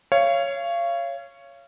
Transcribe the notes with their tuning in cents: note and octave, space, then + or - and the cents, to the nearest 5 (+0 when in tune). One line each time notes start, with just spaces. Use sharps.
C#5 +0 F5 -30